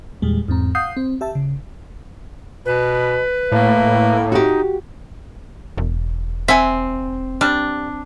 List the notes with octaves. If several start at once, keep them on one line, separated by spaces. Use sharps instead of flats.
E2 A#2 G3 G#3
E2 G#2 C4 A#5
F5 F#5 D#6 G6 C7
C4
G4 E5 A5
C#3
B2 B4
A2 A#3
D#4 F#4 G4
E1
C4 E5 F#5 G#5
G3 D4